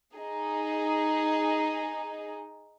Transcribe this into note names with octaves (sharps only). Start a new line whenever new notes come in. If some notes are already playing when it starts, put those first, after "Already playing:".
D#4 G#4